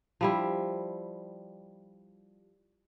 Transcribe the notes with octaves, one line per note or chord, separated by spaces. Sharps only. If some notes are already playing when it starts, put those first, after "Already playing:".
F3 G3 E4